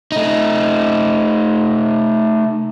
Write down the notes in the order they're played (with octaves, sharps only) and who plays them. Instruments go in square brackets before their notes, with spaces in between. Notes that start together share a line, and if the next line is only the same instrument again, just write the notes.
[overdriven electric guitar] A3 D#4